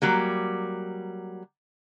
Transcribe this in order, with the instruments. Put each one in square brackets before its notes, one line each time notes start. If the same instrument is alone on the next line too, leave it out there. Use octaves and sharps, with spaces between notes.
[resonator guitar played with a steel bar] F#3 G3 A#3